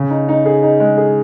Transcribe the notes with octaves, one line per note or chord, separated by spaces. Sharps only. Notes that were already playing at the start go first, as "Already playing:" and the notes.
Already playing: C#3
D#4
D#4
G#4
D#4
G#3
G#4